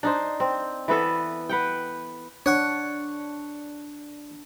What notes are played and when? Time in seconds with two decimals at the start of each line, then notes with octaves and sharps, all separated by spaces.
0.03 D4 D#4 C5
0.40 C4
0.88 E3 B3 A4 B4
1.49 B4 F#5 G5
2.46 D4 C#5 F#5 C#6